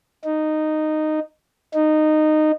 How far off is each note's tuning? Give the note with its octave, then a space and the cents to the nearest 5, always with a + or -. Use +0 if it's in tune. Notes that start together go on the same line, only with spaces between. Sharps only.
D#4 -10
D#4 -15